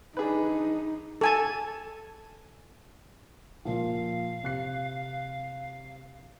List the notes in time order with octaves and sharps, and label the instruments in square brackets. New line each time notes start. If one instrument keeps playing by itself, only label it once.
[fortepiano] D4 G#4 B4 [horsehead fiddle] D#4
[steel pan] A4 G#5 A5
[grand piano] A#2 F3 [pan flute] F5
[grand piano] C3 F#6 C7